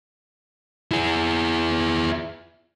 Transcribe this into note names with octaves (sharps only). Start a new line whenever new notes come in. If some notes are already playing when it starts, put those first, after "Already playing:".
E4 G#4